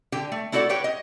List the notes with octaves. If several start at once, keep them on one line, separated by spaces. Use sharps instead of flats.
D3 G4 G5
A3
A3 E4 F#4 A4 D5 F#5
G4 B4 C#5 G5
D#5